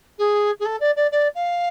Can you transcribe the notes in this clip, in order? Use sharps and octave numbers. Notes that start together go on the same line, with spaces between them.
G#4
G#4
A4
D5
D5
D5
F5